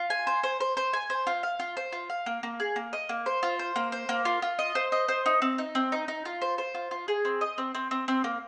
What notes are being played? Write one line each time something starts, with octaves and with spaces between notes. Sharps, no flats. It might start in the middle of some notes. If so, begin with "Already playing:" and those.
Already playing: F4
G#5
C5
C5
C5
C5
G#5
C5
F4
F5
F4
C5
F4
F5
A#3
A#3
G#4
A#3
D#5
A#3
C5
F4
C5
A#3
C5
A#3
F4
F4
D#5
C5
D#5
C5
D#4
C4
D#4
C4
D#4
D#4
F4
C5
C5
F4
F4
G#4
C4
D#5
C4
C4
C4
C4
A#3